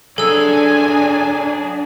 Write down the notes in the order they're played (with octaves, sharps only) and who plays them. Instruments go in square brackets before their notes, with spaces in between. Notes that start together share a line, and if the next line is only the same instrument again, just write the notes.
[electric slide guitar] F#3 G#4 [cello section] D4 [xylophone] A4 E6 [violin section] G#5